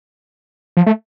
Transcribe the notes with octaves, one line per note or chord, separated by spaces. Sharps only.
F3
A3